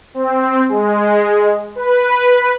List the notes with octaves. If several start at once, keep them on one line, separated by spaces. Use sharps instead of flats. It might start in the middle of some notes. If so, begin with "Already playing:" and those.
C4
G#3
B4